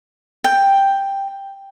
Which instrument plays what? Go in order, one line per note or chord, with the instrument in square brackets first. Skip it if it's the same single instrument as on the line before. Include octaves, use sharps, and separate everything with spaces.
[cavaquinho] G5